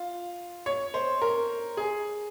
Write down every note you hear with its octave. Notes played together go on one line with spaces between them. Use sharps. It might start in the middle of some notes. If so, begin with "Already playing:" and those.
Already playing: F4
C#5
C5
A#4
G#4